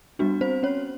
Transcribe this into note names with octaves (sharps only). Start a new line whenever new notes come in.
G3 B3 D4 F#4
C4 C5
C#4 C#5